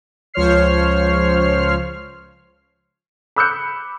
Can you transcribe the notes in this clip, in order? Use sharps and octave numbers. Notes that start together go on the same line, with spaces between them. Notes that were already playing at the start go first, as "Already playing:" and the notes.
C#2 F3 C5 C#5 F6 C7
B5 D6 E6 F#6 G6 C#7